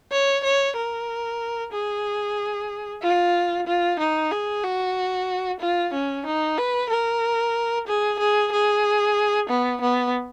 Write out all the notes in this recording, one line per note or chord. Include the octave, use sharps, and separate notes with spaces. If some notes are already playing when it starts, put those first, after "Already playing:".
C#5
C#5
A#4
G#4
F4
F4
D#4
G#4
F#4
F4
C#4
D#4
B4
A#4
G#4
G#4
G#4
B3
B3